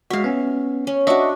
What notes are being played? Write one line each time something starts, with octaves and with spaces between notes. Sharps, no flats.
G#3 F#4 E5 F5
B3 C#4
C#4
D4 F#4 D#5 E5 C#6